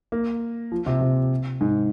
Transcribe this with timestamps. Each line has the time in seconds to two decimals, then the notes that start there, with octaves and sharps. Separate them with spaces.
0.12 A#3
0.72 F3
0.86 C3
1.01 C3
1.61 G#2